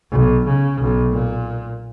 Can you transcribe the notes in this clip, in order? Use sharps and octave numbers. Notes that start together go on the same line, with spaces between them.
B1
C#3
B1
A#2